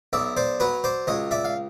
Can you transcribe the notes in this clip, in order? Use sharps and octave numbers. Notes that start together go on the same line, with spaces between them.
B1 D5 E5
C5 D5
F#3 B4 C#5
C5 D5
C#2 C#5 D#5
D5 E5
F5